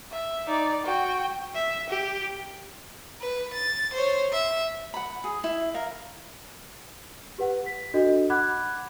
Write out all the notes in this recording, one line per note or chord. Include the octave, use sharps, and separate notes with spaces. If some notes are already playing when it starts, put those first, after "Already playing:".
E5
D#4 D5
F#4 G5
E5
G4
B4
A6
C5 C#5
E5
F#5 B5
G#4
E4
A#4 F5
G4 B4 F#5
B6
D4 F#4 A4 D#5
F#5 B5 D6 F#6 G#6